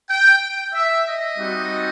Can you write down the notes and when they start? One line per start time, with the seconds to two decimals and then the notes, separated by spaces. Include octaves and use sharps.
0.10 G5
0.73 E5
1.05 D#5
1.37 G3 C4 D#4 F#4